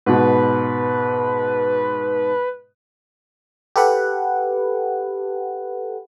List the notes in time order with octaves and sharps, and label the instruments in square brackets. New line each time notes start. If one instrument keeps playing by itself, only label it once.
[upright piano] G#2 B2 [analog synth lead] B4
[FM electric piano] G4 A4 B4 F#5